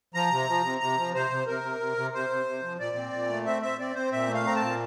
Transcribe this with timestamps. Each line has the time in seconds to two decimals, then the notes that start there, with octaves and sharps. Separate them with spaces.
0.14 F3 A#5
0.31 C3
0.47 F3
0.64 C3
0.80 C3 A#5
0.97 F3
1.14 C3 C5
1.30 C3
1.47 C3 A#4
1.63 C3
1.80 C3
1.97 C3
2.13 C3 C5
2.30 C3
2.46 C3
2.62 F3
2.79 A#2 D5
2.96 C4
3.13 A#2
3.29 A3
3.46 C4 E5
3.62 C4 E5
3.79 C4 D5
3.95 C4 C5
4.12 A#2 E5
4.28 A3
4.34 F5
4.44 C4 A#5
4.56 A5
4.62 A#2